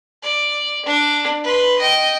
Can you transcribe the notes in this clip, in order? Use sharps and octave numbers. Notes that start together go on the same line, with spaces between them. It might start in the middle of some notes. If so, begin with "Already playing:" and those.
D5
D4
B4 C6
D#5 G5